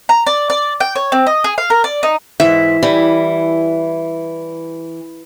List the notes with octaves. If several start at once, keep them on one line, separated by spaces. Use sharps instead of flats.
A#5
D5
D5
G5
C#5
C4
D#5
G#4
F5
A#4
D5
D#4
G#2 E3 E5
E3 G3